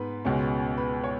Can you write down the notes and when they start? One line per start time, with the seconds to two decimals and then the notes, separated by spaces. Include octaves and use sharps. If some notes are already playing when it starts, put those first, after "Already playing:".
Already playing: G#2 B3 B4
0.25 C#2 B2 G#3 C#4
0.78 B4
1.04 C#5